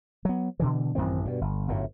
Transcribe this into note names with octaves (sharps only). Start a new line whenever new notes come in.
F#3 B3
B2 D3 E3
A1 F#2 D#3 C4
G2 B2
G1
G1 F#2 A2